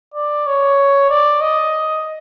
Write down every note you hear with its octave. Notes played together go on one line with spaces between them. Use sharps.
D5
C#5
D5
D#5